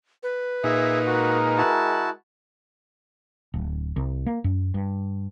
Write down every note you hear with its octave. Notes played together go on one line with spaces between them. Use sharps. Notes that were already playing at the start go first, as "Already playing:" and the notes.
B4
A#2 D#4 G#4 E5
G#3 F#4 A#4
E4 F#4 A5
D1
C2
A#3
F#2
G2